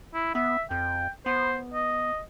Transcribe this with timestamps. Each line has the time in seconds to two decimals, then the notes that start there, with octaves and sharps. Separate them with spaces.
0.14 E4
0.35 B3 E5
0.71 F2 G5
1.26 B3 C5
1.74 D#5